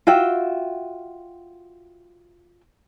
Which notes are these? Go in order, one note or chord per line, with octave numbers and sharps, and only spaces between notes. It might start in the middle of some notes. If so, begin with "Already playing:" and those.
F4 F#4 E5 G5